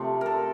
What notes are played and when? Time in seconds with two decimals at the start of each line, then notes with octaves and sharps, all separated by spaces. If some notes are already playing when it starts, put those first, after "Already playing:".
Already playing: C3 F3 A3
0.21 A4 A#4